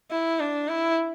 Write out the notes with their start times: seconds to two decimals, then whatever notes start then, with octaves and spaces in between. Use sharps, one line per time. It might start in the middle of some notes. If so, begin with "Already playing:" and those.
0.11 E4
0.40 D4
0.68 E4